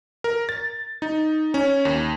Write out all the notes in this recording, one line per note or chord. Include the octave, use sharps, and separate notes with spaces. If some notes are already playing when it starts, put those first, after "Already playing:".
A#4
A6
D#4
C#4
D#2